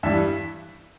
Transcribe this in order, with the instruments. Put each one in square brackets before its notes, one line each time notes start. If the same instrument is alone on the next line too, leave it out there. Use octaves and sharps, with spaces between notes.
[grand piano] G2 E3 G3 E5